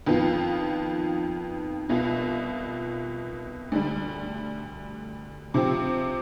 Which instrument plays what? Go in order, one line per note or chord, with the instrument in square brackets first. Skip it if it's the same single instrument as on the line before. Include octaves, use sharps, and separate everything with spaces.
[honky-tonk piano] F2 D#3 B3 F4
C2 B2 B3 F4
D2 D3 G3
C3 F3 C4 G4